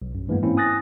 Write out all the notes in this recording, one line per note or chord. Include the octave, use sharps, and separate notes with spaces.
B1
F#2
G2 E3 G#3 A#3 B3
G#2 A#3 C4 C#4 E4
G#5 D#6 F#6 A6 A#6